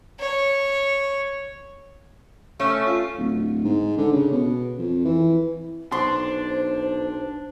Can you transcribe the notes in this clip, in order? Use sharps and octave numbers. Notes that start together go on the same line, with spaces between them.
C#5
A3 C#4
F4
D1
G#2
D3
C#3
B2
F2
E3
B1 D4 C5 C6